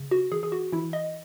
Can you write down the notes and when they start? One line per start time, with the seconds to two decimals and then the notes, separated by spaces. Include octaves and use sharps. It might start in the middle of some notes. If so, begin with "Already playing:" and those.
Already playing: C#3
0.11 F#4
0.32 E3 G#4
0.43 G#4
0.52 F#4
0.72 E3 E4
0.93 D#5